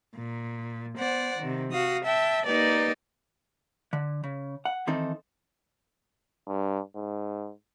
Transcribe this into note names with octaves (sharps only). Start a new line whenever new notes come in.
A#2
B3 C5 D5 F#5
C3 D#3
F#4 F5 D#6
E5 G5 A5
A#3 D#4 G4 B4 D5
D3
C#3
F#5
D#3 E3 C4 D#4 A4
G2
G#2